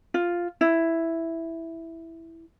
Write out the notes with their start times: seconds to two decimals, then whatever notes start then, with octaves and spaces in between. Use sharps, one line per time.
0.14 F4
0.61 E4